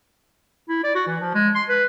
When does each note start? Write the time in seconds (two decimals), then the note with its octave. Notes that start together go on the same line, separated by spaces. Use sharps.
0.69 E4
0.83 D5
0.95 F#4
1.07 E3
1.20 F3
1.34 G#3
1.55 C6
1.69 B4